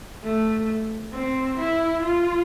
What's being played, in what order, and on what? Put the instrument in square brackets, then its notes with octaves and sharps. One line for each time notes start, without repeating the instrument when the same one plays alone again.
[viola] A3
C4
E4
F4